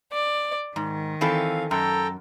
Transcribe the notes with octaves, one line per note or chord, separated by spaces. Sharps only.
D5
G#2 D#3
E3 C4 A4 F5
F#2 A4 G5 A#5